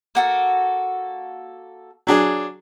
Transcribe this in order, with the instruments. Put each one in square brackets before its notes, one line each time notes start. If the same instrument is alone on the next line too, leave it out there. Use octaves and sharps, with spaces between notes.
[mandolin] A#3 F#4 A4
[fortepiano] F#3 D4 G#4